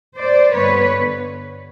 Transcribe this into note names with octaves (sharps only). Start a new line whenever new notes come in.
C5 D5
G2 D3 G3 B3 B4 C#5